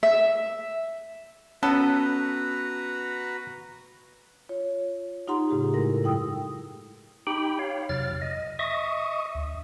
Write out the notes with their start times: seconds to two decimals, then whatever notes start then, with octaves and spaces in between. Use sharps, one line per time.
0.03 E5
1.63 B3 C#4 F#4 A4 B4 A#5
4.49 F4 C#5
5.28 D#4 F4 G4 F#5 A#5 C6
5.50 A2 C#3 A3 G4 G#4
5.74 G#3 D#4 E4 A4 A#4 A#6
6.03 G2 F#3 E4 G5 D#6 E6
7.27 D#4 G4 G5 B5
7.59 C#5 F5
7.89 F2 C3 F#3 F6 A6
8.22 D#5
8.59 D#5 E5 C#6 D#6
9.35 D2